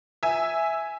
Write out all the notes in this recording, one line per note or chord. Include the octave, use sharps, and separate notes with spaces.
E5 G#5